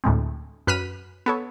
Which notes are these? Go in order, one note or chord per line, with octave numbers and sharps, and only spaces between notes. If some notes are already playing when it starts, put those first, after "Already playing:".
D2 A2 G#3 C4
F#2 B4 F6 F#6 B6 D#7
B3 A4 C#5